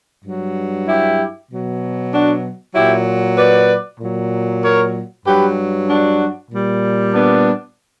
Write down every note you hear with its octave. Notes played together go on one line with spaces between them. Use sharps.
G2 F#3
E4 G4
B2 F#3
D4 F#4
A#2 F#3 E4 G4
B4 D5
A#2 F#3
A#4 C#5
G2 F#3 G4 B4
D4 F#4
A#2 G3
B3 D4